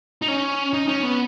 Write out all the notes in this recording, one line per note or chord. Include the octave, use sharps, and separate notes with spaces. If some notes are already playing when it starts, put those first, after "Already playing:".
D#4
C#4
D#4
C#4
B3